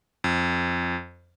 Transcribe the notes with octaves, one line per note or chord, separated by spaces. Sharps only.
F2